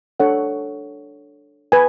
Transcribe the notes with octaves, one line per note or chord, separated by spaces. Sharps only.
D4 A4 C#5 F#5
B4 G#5